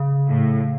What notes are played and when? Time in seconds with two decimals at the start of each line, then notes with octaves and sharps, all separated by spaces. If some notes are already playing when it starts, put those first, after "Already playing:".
Already playing: C#3
0.28 A2